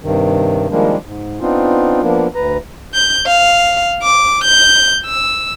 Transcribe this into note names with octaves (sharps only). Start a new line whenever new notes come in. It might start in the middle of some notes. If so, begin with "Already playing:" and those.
G2 C3 D#3
D#3 F3 G3 G#3 A#3 D4
G#2
B3 C4 D4 D#4 F4
F3 A#3 B3 D4
D2 B4 A#5
G6
F5
D6
G6
E6